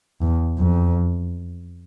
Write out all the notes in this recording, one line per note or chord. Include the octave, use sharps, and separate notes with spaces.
E2
F2